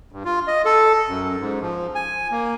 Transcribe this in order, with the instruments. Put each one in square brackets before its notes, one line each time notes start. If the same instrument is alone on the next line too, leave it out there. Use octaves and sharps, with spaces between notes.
[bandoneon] G2
F4
D#5
A4
F#2
G#2
F3
G#5
A#3